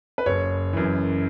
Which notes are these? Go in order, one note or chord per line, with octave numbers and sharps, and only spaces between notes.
B4
F#1 C#5
F#2 E3